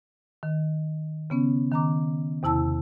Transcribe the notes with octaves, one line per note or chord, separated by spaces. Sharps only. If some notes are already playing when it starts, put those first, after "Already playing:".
D#3
C#3 B3 C#4
D#3 A#5 D6
E2 C3 E4 A5 E6